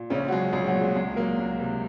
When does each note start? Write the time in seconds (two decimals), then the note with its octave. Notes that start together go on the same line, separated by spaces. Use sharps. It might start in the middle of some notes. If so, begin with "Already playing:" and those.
Already playing: A#2
0.10 A#1 C#3 C#4
0.28 F#4
0.32 F#3 G#3 G#4
0.53 A#1 G#3 G#4
0.67 F#3 F#4
0.75 A#2
0.81 G#3 G#4
0.95 C#2 G#3 G#4
1.16 F#3 A#3 A#4
1.39 C#2
1.59 C3